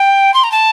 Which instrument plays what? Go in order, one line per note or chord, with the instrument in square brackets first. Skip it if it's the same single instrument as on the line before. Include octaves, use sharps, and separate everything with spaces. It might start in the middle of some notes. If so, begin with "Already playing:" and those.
Already playing: [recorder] G5
C6
A#5
A5